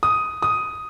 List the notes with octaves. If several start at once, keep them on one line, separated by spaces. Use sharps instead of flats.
D#6
D#6